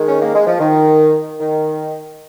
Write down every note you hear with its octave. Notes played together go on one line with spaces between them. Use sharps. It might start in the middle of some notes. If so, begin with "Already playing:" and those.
Already playing: D#3 G#3
C#4
A#3
G#3
F3
D#3
D#3